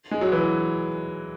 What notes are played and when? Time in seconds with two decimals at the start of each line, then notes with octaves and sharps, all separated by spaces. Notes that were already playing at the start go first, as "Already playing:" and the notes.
0.11 G#3
0.21 F#3
0.32 E3